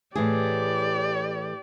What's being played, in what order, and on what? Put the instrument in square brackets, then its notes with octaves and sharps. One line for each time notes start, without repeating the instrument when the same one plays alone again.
[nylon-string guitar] A2 E3 G#4 [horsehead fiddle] G4 D5